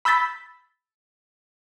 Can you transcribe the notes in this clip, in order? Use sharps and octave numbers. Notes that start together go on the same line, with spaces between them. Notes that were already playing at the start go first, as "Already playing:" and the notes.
B5 E6 G6 A6 B6